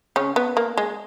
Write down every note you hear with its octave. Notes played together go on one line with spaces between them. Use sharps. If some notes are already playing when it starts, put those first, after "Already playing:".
C#3 C#4
B3
A#3
G#3